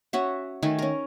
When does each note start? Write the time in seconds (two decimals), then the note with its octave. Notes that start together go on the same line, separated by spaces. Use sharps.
0.13 C#4 F#4 E5
0.62 D#3 A3 A4 G#5
0.79 C#4 A#4